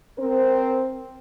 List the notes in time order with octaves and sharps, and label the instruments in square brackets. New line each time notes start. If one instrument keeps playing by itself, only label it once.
[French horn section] C4 A#4 C5